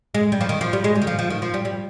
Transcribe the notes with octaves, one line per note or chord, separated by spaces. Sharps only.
G#3
G3
F3
D#3
F3
G3
G#3
G3
D#3
F3
F3
D#3
F3
G3
G3